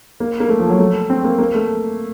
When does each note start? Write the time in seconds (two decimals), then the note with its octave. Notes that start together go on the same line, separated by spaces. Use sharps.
0.20 A#3
0.40 A#3
0.49 A3
0.60 F3
0.70 F#3
0.79 A3
1.10 C4
1.24 A#3
1.38 A#3
1.55 A3